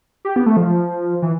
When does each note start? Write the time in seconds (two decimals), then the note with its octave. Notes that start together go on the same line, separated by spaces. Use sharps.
0.25 G4
0.36 B3
0.46 A3
0.57 F3
1.22 E3